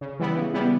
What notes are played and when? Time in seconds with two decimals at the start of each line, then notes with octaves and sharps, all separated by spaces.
0.01 C#3
0.19 E3 G3 B3 E4
0.37 C#3
0.54 E3 G3 B3 E4